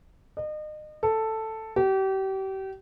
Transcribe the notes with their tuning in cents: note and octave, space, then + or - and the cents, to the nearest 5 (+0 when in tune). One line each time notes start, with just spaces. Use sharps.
D#5 -35
A4 +5
G4 -35